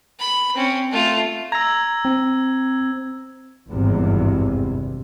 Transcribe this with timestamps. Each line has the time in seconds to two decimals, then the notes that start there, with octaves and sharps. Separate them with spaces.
0.20 B5
0.54 C4 C#4
0.92 A3 F4
1.52 A#5 E6 G#6 A#6
2.05 C4
3.69 G#1 E2 G2 C3